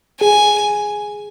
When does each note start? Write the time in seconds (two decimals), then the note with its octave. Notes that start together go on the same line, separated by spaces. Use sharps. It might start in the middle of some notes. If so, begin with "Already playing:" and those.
0.20 G#4 G#5